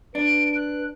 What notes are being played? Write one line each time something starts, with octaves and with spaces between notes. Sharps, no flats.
D4 B4 D7
F#6